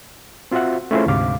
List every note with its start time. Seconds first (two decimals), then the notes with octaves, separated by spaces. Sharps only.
0.51 C4 F4 F#4 C5 E5 F#5
0.91 A3 C#4 E4 F4 G#4 C5
1.06 D2 G#2 C3 F5 D6